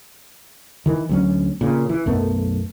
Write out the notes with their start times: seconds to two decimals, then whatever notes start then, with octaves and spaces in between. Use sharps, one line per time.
0.86 D#3 E3
1.09 D2 F#3 C#4
1.61 A#2 C#3
1.89 E3
2.06 B1 F#2 A3 B3